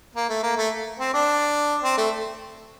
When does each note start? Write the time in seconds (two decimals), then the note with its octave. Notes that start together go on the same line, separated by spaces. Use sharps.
0.16 A#3
0.29 A3
0.43 A#3
0.57 A3
1.00 C4
1.14 D4
1.83 C4
1.98 A3